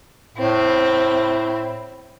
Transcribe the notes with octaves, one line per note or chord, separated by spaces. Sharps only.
A2 C4 E4